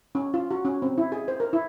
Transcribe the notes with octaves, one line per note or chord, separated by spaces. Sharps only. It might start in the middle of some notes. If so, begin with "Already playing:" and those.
C#4
F4
F#4
C#4
C4
E4
G#4
C5
A#4
E4